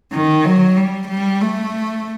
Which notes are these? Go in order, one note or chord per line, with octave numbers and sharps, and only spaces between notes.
D#3
F#3
G3
G3
A3